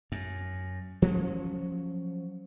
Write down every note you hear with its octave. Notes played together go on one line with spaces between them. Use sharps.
F#2
F3 F#3 C#4